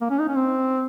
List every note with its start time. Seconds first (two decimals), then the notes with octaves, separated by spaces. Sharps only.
0.01 A#3
0.10 C#4
0.19 D#4
0.28 C#4
0.35 C4